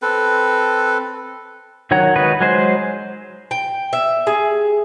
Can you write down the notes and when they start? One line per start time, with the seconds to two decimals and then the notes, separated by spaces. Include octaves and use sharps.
0.02 C4 A4 B4
1.91 D#3 F#3 C#5 F#5 A#5
2.16 G#3 D#4 F#4 B4
2.41 F#3 G#3 G#4 C5
3.51 G5
3.93 E5
4.27 G#4